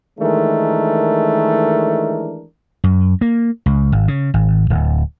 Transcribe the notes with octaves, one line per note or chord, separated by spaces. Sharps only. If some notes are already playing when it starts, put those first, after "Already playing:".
D#3 E3 G#3 A3 D4 A#4
F#2
A#3
C#2
G#1
C#3
G#1
D1